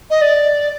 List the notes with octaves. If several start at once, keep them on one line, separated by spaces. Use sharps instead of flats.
D#5
D5